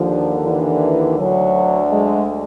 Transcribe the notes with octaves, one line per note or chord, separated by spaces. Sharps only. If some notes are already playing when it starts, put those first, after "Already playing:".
Already playing: D#2 D3 F3
E3
D2 D3 F#3
G#3